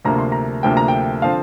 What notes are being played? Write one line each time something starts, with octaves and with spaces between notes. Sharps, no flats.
D2 C3 F3 A#3 A#5
C6
A#5
D2 C3 F3 A#3 G5
A#5
G5
D3 F3 C4 F5